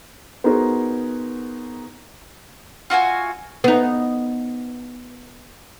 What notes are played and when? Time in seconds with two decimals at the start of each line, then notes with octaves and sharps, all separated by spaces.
0.44 B3 D#4 F#4 G#4 A#4 C5
2.90 F4 F#4 E5 G#5
3.64 B3 D#4